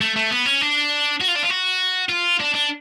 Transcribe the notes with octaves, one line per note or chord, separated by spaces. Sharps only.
A3
A3
B3
C#4
D4
F#4
F4
D4
F4
F#4
F4
D4
D4